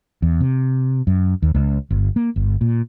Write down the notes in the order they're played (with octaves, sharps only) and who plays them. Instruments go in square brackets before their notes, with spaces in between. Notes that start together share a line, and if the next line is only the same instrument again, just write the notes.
[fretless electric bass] E2
C3
F#2
D#2
C#2
G1
A#3
G1
A#2